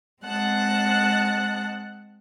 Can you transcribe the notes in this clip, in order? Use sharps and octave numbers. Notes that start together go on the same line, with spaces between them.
G#3 C4 F#5 A5 F#6